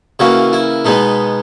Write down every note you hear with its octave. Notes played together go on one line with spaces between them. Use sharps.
C#3 E3 A#3 F#4
E4
B2 G#3 B3 D#4